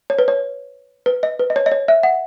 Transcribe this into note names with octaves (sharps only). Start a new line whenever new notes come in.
C#5
B4
C#5
B4
D#5
B4
D#5
C#5
D#5
C#5
E5
F#5